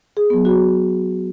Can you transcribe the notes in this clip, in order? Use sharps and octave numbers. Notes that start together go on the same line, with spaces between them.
G#4
F#3 B3
F#4